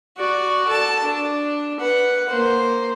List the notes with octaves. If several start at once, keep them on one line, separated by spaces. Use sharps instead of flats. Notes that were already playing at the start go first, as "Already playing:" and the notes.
F#4 D5
A4 A5
D4
B4 F#5
A#3 C5